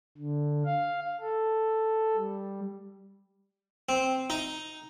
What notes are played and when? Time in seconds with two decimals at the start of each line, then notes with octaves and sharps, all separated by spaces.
0.18 D3
0.65 F5
1.20 A4
2.16 G3
3.89 C4
4.30 D#4